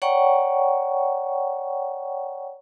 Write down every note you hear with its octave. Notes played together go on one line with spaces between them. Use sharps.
C#5 D5 F#5 G5 A#5 C#6